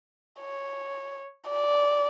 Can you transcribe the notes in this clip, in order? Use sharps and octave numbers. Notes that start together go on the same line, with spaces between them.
C#5
D5